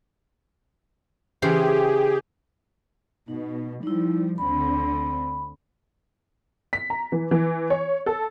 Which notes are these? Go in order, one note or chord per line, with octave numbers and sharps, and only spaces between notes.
C#3 E3 G4 G#4 C5
B2 D#4
F3 G3 D#4 E4
D2 D3 C4 B5
B6
A#5
E3
E3
C#5
A4